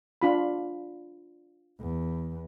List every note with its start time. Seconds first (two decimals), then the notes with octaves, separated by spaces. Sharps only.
0.22 D4 F4 B5
1.80 E2